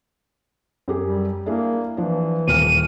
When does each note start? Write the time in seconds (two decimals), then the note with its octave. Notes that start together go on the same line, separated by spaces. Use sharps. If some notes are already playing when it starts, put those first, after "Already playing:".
0.88 F#2 G4 G#4
1.04 G3
1.46 A#3 D4 E4 G#4
1.97 E3 F3 D4
2.48 D#1 D#2 F6 D#7